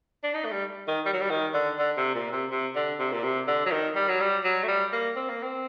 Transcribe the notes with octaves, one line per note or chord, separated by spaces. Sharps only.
D4
D#4
A3
G3
D#3
G3
F#3
G3
D#3
D3
D3
C3
A#2
C3
C3
D3
C3
A#2
C3
D3
F#3
D#3
G3
F#3
G3
F#3
A3
G3
A#3
C4
A#3
C4